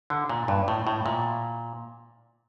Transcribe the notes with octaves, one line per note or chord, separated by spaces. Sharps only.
D3
A#2
G2
A2
A2
A#2